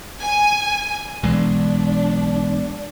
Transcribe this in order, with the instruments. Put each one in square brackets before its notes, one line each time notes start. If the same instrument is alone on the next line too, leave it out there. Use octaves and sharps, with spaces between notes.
[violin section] G#5
[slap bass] B1 E3 G#3 [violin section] D4